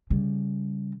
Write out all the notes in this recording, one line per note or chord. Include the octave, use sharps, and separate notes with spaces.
C#3 G3